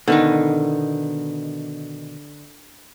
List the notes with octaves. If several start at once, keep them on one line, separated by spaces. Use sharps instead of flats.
B2 D3 D#3 D#4